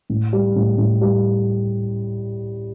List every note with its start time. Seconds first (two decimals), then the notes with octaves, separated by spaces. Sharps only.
0.10 A2
0.33 G3
0.56 A2
0.78 A2
1.01 G3